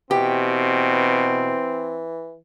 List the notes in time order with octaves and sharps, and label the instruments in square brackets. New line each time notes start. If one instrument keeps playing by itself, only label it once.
[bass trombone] B2 [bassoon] E3 [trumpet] C4 [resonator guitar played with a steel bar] G4